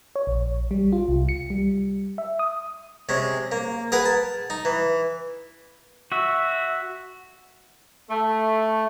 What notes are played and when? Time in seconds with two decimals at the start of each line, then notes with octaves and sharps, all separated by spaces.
0.16 C#5
0.27 A#1
0.71 G3
0.92 F4
1.08 C2
1.29 C#7
1.50 G3
2.18 E5
2.39 D#6
3.09 C3 G#3 C#4
3.52 A#3
3.92 G#4 A#4 B4 F#5
4.05 A5
4.50 D#4
4.65 E3
6.12 F#4 E5
8.10 A3